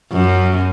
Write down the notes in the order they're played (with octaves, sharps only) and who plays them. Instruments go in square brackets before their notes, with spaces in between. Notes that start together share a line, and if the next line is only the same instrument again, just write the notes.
[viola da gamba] F#2